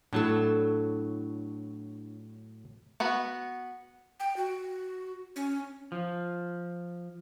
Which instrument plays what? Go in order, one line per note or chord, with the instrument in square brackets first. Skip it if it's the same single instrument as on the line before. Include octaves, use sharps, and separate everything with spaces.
[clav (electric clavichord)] A2 F#3 [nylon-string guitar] D4 E4 A4
[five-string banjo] B3 F#4 B4
[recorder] G5
F#4
C#4
[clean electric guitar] F3